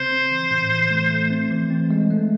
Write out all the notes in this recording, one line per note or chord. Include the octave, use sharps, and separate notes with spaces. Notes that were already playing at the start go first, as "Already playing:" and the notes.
Already playing: C#3 C4 C5
C4
E3
A2
E3
A3
A3
C4
E3
C4
G#3
A3